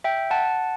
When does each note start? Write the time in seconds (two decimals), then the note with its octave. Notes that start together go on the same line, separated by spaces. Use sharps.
0.04 E5 G5
0.31 F#5 A5